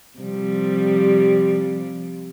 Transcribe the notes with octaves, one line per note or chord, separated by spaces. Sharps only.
C3 F3 G3